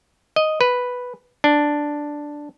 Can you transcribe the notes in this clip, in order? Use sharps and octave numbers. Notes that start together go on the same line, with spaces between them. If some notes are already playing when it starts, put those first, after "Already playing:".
D#5
B4
D4